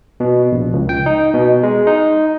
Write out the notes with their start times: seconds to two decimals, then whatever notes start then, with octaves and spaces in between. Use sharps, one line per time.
0.20 B2
0.52 A#1
0.73 C#2
0.89 G5
1.06 D#4
1.34 B2
1.63 G#3
1.87 D#4